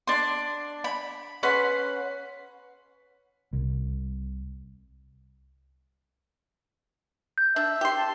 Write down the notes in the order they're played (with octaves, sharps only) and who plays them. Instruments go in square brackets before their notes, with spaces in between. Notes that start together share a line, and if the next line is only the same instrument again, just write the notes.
[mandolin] D4 C6
B5
C#4 B4 F#5 C6
[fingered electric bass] C2
[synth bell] G6
[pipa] D4 [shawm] E5
[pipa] G4 C6
[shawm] A5